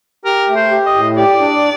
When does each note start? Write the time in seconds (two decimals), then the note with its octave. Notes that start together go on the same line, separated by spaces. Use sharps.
0.25 G4 A#4
0.49 A3
0.55 C5
0.71 G4
0.86 D#5
0.95 A2
1.17 G4 D5
1.41 D4